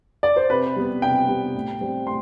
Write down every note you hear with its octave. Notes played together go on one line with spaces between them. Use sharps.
D5
C5
C3 B4
G3 B3
C3 G5
G3 B3
A2
G3 C4
A2 C6